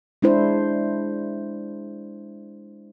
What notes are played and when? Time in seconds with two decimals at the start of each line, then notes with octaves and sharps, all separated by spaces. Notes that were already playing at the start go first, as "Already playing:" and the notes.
0.22 G#3 D4 E4 C5